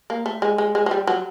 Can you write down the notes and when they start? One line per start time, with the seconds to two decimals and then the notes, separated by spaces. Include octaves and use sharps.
0.10 A#3
0.26 A3
0.42 G#3
0.58 G#3
0.75 G#3
0.86 G#3
0.91 G3
1.07 F#3